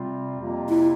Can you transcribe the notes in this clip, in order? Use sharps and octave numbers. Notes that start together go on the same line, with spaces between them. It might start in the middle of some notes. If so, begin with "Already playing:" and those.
Already playing: C3 G3 C4 F4
F2 C3 F3 A#3 F4
E4